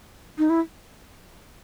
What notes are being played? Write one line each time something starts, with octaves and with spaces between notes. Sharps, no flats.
D#4
E4